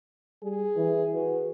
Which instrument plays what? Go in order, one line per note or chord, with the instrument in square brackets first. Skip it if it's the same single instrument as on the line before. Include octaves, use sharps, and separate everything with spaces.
[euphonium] G3 [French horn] G#4
[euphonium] E3
[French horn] F#4 [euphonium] B4